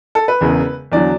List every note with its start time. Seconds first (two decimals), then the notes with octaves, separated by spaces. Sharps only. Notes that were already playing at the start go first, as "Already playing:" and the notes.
0.15 A4
0.28 B4
0.41 E1 E2 C#3
0.92 E2 D3 F#3 D5